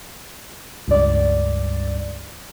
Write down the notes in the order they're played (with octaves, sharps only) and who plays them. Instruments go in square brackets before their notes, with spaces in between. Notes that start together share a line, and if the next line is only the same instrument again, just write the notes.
[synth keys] C#2 G2 D5